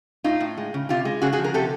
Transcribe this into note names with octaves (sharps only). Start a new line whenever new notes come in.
A2 D#4 F4
A2
G#3
C#3
C3 F4 G4
G#3
C#3 F#4 G#4
F#4 G#4
F3
G#4 A#4
C3 G4 A4